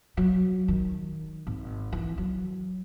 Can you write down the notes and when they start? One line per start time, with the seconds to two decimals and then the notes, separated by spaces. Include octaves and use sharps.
0.17 F#3
0.68 D#3
1.47 G#1
1.93 E3
2.18 F#3